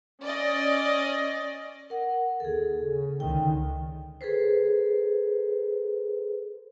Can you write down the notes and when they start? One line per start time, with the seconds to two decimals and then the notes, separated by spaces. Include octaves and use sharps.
0.21 C#4 D5 D#5
1.90 A#4 F#5
2.40 D#2 G#4 A4
2.83 C#3
3.20 C#2 D3 D#3 G5
4.21 G#4 A4 B4 C5